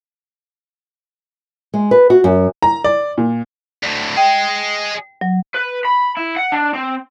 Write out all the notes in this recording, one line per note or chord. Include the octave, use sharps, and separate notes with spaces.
G#3
B4
F#4
F#2
A#5
D5
A#2
D2 A2
G#4 D#5 G5
F#3
B4
B5
E4
F#5
D4
C4